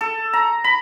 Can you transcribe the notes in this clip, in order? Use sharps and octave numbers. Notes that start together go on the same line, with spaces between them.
A4
A#5
B5